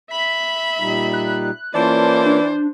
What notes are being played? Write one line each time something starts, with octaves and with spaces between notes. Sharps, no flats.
E5 B5 B6
A#2 G3 D#4
F#6
E3 A#3 C#4 F4 C5 D5 A5
D4